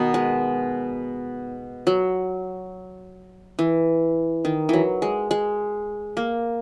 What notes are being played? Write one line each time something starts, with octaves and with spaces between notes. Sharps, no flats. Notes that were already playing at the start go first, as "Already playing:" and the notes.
Already playing: B2 D#3 B3 D#4
G#3
F#3
E3
D#3
E3 F#3
G#3
G#3
A#3